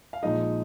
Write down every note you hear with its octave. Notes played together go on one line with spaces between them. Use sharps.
F5
A#1 A#2 F3 G#3 D#4 D#5